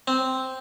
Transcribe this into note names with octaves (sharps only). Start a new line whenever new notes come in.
C4